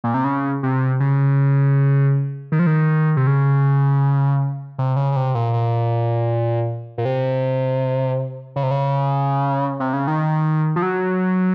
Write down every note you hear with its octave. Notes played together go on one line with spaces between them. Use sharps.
A#2
C3
C#3
C3
C#3
D#3
F3
D#3
C3
C#3
C3
C#3
C#3
C3
A#2
A#2
A#2
C3
C#3
C3
C#3
C3
C#3
D#3
F3
F#3